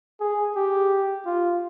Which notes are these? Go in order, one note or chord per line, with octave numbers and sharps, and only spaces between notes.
G#4
G4
F4